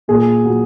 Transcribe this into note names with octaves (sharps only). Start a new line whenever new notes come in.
A#2 G#4
F#3